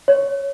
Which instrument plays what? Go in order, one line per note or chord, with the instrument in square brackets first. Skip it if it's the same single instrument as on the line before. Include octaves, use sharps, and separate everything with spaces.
[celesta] C#5